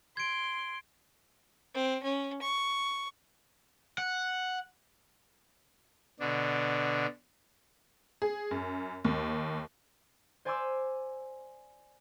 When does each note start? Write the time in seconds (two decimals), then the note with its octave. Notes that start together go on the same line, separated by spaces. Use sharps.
0.17 C6 G#6 D7
1.74 C4
2.03 C#4
2.42 C#6
3.98 F#5
6.20 B2 D3 D4
8.22 G#4
8.51 F#2
9.05 D#2
10.45 C5 D5 G#5 C6 D6 E6